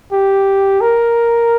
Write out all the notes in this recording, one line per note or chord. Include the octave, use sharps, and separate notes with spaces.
G4
A#4